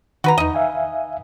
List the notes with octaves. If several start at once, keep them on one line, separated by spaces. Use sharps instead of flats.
D#3 F#4 B4 A#5
E2 D#4 D#5
E5 F5 G#5